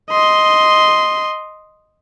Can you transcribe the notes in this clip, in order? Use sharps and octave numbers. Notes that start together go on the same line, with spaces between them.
D#5 C6